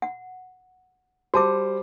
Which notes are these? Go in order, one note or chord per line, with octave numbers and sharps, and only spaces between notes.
F#5
G3 F#4 C5 A5 D6